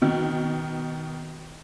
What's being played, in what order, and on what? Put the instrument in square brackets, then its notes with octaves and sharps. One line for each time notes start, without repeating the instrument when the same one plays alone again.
[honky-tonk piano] B2 D#3